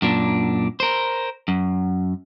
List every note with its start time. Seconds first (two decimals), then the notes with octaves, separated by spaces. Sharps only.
0.02 F#2 A#2 D4
0.80 A#4 C5
1.48 F#2